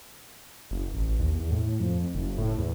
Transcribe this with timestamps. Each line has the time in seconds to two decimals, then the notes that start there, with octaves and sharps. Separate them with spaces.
0.71 F#1
0.95 A1
1.20 D#2
1.33 E2
1.51 A2
1.80 F2
2.15 F#1
2.38 A2
2.58 E2